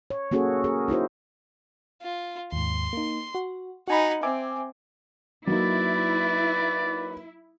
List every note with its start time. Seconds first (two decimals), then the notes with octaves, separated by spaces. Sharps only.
0.10 C#5
0.31 A#3 C#4 F#4 G#4 A4 C#5
0.64 G#4 A#4
0.88 D#4 E4 F#4 C5
2.02 F4
2.52 D#2 G#2 C6
2.93 A#3 D#4
3.35 F#4
3.88 D#4 F#4 F#5 G#5 B5
4.23 C4 E5 G#5 D6
5.47 F#3 A#3 D#4 E4 B4 D5